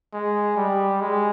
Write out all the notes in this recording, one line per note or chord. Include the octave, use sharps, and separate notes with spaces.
G#3
G3
G#3